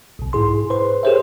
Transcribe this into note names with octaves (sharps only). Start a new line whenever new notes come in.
B1 B2
G#2 E4 G#4 C6
B4 C5 C6
G4 G#4 A#4 C5 C#5 E5